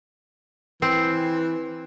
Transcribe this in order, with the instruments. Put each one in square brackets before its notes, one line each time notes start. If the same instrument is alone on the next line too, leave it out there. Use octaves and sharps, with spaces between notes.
[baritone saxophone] E3 [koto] C4